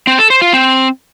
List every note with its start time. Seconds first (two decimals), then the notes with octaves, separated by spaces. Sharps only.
0.07 C4
0.19 A4
0.30 C5
0.42 F4
0.53 C4